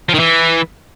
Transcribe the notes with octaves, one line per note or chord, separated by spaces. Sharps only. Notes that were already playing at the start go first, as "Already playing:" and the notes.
F3
D#3
E3